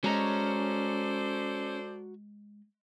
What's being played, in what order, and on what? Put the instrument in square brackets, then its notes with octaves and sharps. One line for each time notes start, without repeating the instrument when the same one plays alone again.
[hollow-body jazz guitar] G#3 D#5 [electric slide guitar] C#4 [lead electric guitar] F#4 A#5 [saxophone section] A4 C5 D5